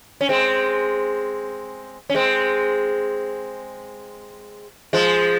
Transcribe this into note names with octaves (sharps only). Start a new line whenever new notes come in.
C#4
G#3 C4
C#4
G#3 C4
F3 G#3